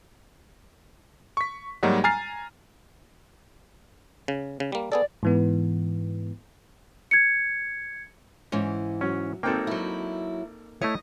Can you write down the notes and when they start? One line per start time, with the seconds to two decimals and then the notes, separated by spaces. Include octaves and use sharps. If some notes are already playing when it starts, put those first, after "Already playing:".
1.37 C#6 B6
1.83 G#2 F#3 G3 A#3 D#4 F#4
2.04 G#5 A#5 F6 A6 C7
4.28 C#3
4.60 C#3
4.72 G3 A#3
4.92 B3 G#4 A4 D5
5.23 G#2 E3 B3
7.11 G#6 C#7
8.52 G#2 E3 C#4
9.01 F#3 C#4
9.43 G#1 A#3 C4 D#4 A4 G5
9.67 F#3 E4
10.82 A3 E4 C#5 D#5